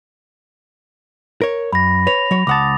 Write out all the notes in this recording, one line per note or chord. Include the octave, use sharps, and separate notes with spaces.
A#4 C#5
F#2 B5 A#6
B4 C#5 A#6 F7
F#3 C#5
C#2 F#5 A5 D6 D#6 A6